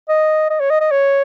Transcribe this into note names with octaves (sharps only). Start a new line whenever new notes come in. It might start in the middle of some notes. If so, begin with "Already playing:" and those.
D#5
D#5
C#5
D#5
D#5
C#5